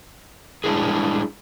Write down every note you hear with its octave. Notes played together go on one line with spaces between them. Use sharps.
G3 G#3 D4 E4 G#4